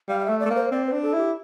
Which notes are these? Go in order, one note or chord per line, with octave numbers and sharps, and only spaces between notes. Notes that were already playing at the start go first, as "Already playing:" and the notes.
G3 F5
F5
A3 E5
D5
A3
A#3
C5
C4 D5
C5
D4
A4
E4 G4